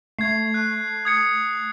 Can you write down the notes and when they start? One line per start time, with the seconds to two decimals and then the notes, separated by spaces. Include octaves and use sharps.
0.19 A3 G#6 C7
0.54 F#6
1.05 D#6 G#6 C#7